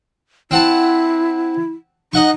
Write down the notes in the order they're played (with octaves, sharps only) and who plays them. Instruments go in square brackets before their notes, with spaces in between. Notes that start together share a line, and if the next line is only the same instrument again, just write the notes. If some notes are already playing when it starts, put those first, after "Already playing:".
[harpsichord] C4 F#5 A5 [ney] E4
[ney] D#4 [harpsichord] D#5 F#5 C#6